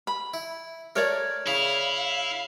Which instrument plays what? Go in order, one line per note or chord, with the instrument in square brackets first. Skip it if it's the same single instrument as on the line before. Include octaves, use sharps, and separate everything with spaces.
[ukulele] B5
[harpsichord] E4
[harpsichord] A3 [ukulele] A#4 C#5 D5
[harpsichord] C#3 [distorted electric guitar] E4 [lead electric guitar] F5